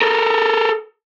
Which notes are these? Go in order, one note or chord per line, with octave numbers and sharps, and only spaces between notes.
A4 A#4